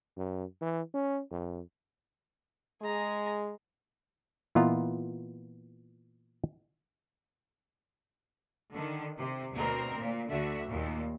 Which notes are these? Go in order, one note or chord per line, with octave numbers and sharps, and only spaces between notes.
F#2
E3
C#4
F2
G#3 G#4 A#5
A#2 E3 B3 F4 D#5 A#5
D3 D#3
C3
D2 B2 C4 A#4
A#2
D2 D3 F#4 E5
D#2 A#2